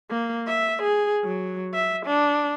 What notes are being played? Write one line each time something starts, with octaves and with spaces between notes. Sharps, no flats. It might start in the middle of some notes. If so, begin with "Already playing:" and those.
A#3
E5
G#4
F#3
E5
D4